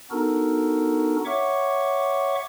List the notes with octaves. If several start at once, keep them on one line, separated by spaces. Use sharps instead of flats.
B3 D4 D#4 F#4 A4 A#4
C#5 E5 F#5 C#6 D6